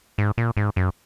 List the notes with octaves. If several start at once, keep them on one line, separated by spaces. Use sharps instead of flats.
G#2
A#2
G#2
F#2